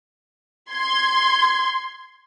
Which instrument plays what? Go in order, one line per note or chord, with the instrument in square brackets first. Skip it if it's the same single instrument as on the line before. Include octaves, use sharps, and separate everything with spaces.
[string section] C6 G#6